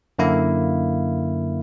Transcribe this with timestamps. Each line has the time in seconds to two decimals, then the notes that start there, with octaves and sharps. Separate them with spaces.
0.19 F#2 D3 A#3 E4 F5